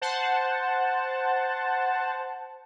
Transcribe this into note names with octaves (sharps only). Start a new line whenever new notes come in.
C5 F#5 A5